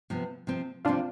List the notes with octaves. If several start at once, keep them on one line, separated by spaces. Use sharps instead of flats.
C3 F3 B3
C3 F3 C4
C3 F3 C4 D4 F4